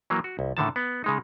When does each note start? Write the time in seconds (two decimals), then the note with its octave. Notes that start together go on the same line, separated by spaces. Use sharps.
0.10 E3 F#3 A#3
0.24 F#4
0.39 C2
0.57 A2 D3 D#3 A5
0.76 B3
1.04 C#3 G#3 D#4